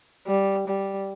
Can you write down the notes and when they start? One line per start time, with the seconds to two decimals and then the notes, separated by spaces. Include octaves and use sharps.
0.27 G3
0.68 G3